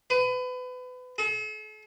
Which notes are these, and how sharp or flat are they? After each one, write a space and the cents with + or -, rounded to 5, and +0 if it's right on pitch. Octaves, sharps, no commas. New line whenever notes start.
B4 +30
A4 -45